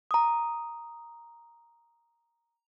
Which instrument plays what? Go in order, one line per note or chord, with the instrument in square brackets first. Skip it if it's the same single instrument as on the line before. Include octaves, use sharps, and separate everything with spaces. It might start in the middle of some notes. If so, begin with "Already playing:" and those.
[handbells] A#5 D#6